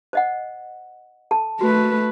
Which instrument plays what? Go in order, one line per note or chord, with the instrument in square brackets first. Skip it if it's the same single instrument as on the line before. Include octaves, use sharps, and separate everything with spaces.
[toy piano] C5 D#5 F#5
A4 A5
[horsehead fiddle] A3 B4 [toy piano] F#4